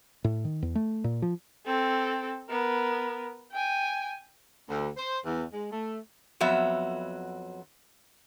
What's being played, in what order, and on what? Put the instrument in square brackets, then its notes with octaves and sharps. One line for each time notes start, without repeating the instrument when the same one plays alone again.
[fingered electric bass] A2
D#3
E2
A3
A#2
F3
[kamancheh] C4 A4
B3 A#4
G5 G#5
[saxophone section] D2
C5
E2
G#3
A3
[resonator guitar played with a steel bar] F2 F#3 B3 E5